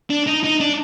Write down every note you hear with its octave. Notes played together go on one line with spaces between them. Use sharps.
D4
D#4
D#4
D4